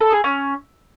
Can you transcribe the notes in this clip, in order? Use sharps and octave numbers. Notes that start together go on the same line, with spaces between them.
A4
G#4
C#4